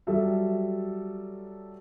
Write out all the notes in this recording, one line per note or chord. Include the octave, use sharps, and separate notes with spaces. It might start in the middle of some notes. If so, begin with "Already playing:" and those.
F#3 G3 A4 E5